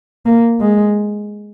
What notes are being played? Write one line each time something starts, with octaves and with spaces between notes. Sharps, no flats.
A#3
G#3